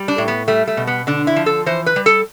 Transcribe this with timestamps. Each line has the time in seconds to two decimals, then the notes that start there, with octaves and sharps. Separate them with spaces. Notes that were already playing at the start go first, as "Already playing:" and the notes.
Already playing: G3
0.08 D4
0.18 A2
0.28 B3
0.48 G3 A3
0.68 A3
0.77 B2
0.87 B3
1.07 D3 D4
1.27 E4
1.36 F3
1.46 A4
1.66 E3 C5
1.86 B4
1.96 G3
2.06 A4